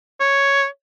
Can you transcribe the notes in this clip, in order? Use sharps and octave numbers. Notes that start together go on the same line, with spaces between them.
C#5